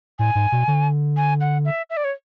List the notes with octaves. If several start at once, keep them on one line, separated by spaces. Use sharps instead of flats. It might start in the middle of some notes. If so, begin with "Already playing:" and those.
A2 G#5
G#2
B2
D3
G#5
F#5
E5
E5
D5
C#5